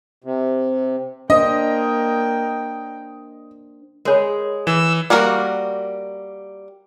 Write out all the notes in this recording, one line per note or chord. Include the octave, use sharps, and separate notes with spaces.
C3
A#3 D4 C5 D#5 G5
G#3 G#4 A#4 C#5 B5
E3 E6
G3 A#3 F#4 A#4